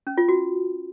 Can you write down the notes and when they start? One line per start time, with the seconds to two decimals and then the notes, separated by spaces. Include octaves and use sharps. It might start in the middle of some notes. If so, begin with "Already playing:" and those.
0.07 C#4
0.18 F4
0.28 F#4